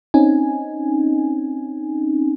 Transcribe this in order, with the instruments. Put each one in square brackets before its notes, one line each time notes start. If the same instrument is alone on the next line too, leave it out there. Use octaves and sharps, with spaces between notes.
[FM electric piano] C4 C#4 D#4 G#5